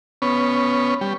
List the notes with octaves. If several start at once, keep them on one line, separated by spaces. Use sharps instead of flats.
B3 C#4
G3